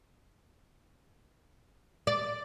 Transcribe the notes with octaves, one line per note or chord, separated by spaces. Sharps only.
D5